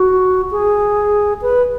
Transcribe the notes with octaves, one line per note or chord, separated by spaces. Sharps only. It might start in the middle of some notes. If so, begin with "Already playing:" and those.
Already playing: F#4
G#4
B4